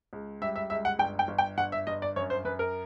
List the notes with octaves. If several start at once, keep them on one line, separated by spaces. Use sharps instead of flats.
C#2
G3 E5
E5
C#2 E5
F#5
G1 G5
G5
G1
G5
G1 F#5
E5
G1 D#5
D5
F#2 C#5
C5
F#2 B4
A#4